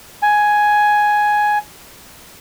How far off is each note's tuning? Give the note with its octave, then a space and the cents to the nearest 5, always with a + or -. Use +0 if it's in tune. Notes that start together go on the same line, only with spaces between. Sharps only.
G#5 +5